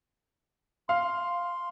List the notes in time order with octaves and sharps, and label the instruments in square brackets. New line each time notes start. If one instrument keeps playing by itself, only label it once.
[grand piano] F5 [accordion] C6